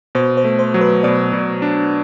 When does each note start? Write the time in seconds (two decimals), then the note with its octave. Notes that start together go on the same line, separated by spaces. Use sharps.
0.15 B2 C5
0.37 C5
0.44 A3
0.59 C5
0.74 F#3
0.81 B4
1.03 B2 D5
1.33 B2
1.62 D4